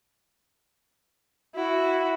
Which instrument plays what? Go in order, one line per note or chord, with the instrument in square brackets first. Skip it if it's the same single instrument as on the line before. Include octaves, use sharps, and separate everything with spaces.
[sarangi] E4 [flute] F#4